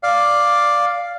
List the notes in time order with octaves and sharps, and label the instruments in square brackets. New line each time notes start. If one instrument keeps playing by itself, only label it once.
[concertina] D5 F5